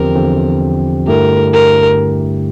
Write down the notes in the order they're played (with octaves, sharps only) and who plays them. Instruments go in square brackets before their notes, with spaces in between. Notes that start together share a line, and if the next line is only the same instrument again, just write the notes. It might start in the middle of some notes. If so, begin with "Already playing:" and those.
Already playing: [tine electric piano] E2 D3 F3 C4 G4 [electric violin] A#4
[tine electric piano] E2 D3 F3 C4 G4
[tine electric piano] G2 D3 A3 E4 G4 [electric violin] A#4
[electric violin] A#4